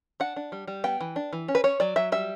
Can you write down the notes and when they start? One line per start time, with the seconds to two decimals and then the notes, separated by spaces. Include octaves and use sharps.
0.20 D4 F#5
0.36 D4
0.52 G3
0.68 G3
0.84 B3 G5
1.01 E3
1.16 D4
1.33 E3
1.48 C#4
1.55 B4
1.64 C#4 C#5
1.80 F#3 D5
1.96 F#3 E5
2.12 G3 E5